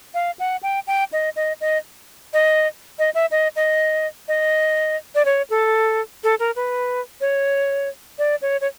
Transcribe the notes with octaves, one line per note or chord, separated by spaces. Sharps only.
F5
F#5
G5
G5
D#5
D#5
D#5
D#5
D#5
E5
D#5
D#5
D#5
D5
C#5
A4
A4
A#4
B4
C#5
D5
C#5
C#5